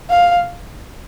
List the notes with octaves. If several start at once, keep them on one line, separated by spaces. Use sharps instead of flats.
F5